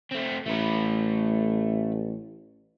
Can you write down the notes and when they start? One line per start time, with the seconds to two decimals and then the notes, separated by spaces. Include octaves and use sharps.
0.11 A3 C4
0.46 A1 A3 B4